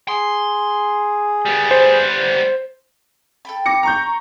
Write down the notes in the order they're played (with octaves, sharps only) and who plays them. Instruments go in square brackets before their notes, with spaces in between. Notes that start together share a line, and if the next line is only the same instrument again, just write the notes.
[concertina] G#4 [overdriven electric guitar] C6
[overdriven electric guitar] G3 B3
[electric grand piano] C5
[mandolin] A4 G5 B5
[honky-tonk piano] D6 A#6 C#7
A#5 C#6 G6